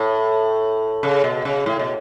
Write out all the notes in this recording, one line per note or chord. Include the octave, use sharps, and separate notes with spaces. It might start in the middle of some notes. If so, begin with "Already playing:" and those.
Already playing: A2
C#3
B2
C#3
A2
B2